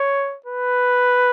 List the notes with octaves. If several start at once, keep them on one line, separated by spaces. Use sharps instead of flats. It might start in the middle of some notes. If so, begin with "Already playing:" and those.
Already playing: C#5
B4